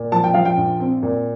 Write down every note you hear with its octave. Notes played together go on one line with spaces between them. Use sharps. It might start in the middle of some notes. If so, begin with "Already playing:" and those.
Already playing: A#2
F3 A5
G5
F3 F5
G5
A#1
C4
A#2